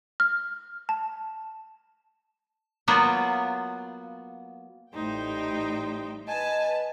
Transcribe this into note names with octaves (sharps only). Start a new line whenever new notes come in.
F6
A5
F#3 A#3 B3 F4
A1 A2 G3 D#4 C5 G5
B4 D#5 G#5 A5